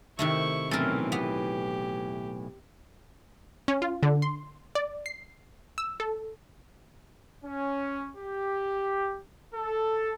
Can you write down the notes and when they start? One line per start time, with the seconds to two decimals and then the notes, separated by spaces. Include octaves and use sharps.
0.19 C3 D#3 A3 E4 C#6
0.71 B1 A2 E3 C4 C#4 A4 A#4
1.12 B3 G4
3.68 C#4
3.82 F4
4.03 D3
4.22 C6
4.75 D5
5.06 C7
5.78 E6
6.00 A4
7.44 C#4
8.16 G4
9.54 A4